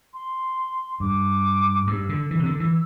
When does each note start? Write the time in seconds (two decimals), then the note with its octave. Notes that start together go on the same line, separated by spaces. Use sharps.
0.14 C6
1.00 G2 D6
1.79 D6
1.87 G2 E6
2.09 D3 E6
2.31 E3
2.39 C3
2.46 D3
2.60 E3